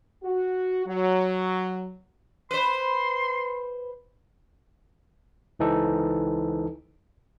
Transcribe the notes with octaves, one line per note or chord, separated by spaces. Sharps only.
F#4
F#3
B4 C5 C6
C#2 E3 D#4 A4 C5